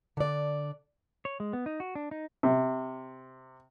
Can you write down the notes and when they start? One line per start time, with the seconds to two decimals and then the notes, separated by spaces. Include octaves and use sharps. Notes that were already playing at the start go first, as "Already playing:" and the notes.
0.17 D3 D5
1.25 C#5
1.40 G#3
1.53 B3
1.66 D#4
1.80 F#4
1.95 D4
2.11 D#4
2.43 C3